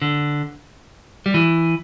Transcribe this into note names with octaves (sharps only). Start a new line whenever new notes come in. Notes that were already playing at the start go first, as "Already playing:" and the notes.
D3
G3
E3